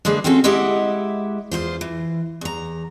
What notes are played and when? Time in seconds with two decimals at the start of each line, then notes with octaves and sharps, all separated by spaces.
0.05 D3 G#3 A#3 G#4 B4
0.24 C4 C#4 F4 F#4 A4
0.44 G#3 E4 G4 D#5 E5 F#5
1.51 E2 G#2 F4 C5
1.81 E3
2.41 E2 A#5